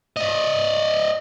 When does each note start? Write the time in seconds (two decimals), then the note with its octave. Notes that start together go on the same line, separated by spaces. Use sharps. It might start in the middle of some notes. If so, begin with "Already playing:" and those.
0.17 D5 D#5